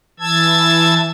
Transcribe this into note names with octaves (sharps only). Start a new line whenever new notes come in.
E3 A5 E6 G#6